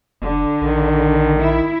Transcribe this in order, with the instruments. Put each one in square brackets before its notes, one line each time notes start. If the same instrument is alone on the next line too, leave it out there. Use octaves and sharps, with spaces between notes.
[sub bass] F1 [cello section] D3
[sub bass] A#1 [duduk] D#3
[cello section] E4